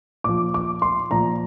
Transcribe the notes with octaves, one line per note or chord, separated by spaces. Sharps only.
A#2 F3 D6
D6
C6
A#2 F3 A#5